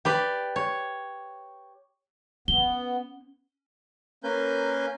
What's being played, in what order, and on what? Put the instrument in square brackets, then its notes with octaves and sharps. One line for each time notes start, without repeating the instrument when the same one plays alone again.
[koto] G4 B4 D5
C#5
[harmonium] B3 [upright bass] C#4 [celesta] G7
[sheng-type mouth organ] A#3 C#4 A#4 B4 G#5 G6